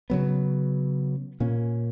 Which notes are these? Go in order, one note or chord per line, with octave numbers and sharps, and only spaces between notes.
C#3 F#3 B3
A#2 A#3 C#4